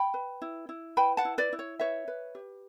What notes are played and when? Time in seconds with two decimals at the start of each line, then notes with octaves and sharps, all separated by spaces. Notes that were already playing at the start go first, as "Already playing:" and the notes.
Already playing: G5 B5
0.14 B4
0.42 E4
0.69 E4
0.97 B4 G5 B5
1.17 F#5 A5
1.25 E4
1.38 B4 D5
1.52 E4
1.59 C#5
1.80 B4 C#5 E5
2.08 B4
2.35 G4